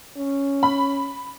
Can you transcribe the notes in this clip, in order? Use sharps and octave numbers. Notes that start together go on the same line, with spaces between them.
C#4
B5